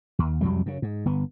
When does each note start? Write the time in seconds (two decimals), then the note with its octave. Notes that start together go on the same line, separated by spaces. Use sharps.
0.19 D#2
0.41 C2 F2 F#3 G3
0.66 F#2 C#3
0.82 G#2
1.05 G1 B3